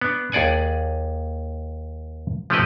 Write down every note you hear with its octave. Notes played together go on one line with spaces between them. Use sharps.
B3 D4
D#2 G#4 D5 F#5 G#5
F3 A3 C#4 G4 B4 D#5